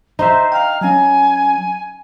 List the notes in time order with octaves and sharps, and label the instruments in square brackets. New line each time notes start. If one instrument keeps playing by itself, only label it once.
[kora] D#4 E5 [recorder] C5
[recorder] F5 [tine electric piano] G5 A#5
[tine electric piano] F#3 C#4 [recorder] G#5